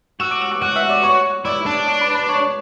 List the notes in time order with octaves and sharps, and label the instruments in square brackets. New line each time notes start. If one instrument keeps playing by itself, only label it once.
[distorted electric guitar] F#4 [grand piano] E6 E7
[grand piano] D6 D7
E6 E7
D6 D7
[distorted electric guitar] F#4 [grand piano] F#5 F#6
[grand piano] E5 E6
D5 D6
C#5 C#6
[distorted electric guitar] E4 [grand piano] D5 D6
[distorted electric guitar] D4
[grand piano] D5 D6
B4 B5
B4 B5
C#5 C#6